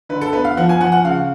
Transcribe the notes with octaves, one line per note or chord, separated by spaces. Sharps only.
D3 B4
A4
B3 B4
F5
F3 F#5
G#5
F3 F#5
F#5
C#3 F5